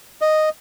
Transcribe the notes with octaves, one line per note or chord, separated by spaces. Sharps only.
D#5